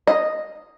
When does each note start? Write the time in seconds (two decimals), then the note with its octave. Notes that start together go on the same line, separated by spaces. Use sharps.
0.07 D#5